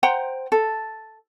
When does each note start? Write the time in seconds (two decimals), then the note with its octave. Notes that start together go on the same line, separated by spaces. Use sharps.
0.03 C5 F#5 G5 A#5
0.52 A4